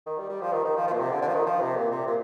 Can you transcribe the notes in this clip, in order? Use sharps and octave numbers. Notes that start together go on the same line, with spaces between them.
D#3
G3
G3
F3
D#3
D#3
F3
F3
A#2
C3
D3
D3
F3
D#3
F3
C3
A#2
C3
A#2